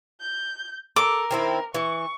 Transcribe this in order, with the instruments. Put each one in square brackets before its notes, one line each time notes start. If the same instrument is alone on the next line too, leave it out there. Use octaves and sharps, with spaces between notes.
[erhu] G6
[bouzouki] A4 [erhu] A#4 [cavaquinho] D6
[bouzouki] D#3 C4 E4
[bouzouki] E3 [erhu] C#6